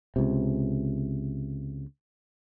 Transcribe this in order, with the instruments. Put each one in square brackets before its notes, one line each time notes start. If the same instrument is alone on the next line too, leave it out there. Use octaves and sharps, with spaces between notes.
[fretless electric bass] C#2 C3